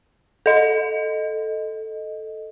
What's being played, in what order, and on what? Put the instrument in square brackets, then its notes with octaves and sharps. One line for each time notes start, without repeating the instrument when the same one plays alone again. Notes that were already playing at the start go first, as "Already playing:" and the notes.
[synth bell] A4 D#5